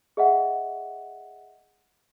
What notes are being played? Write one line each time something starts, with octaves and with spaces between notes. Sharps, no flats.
G#4 D#5 E5 F#5